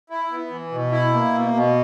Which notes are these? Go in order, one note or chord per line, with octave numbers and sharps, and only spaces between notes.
E4
B3
E3
B2
E4
A#3
B2
B2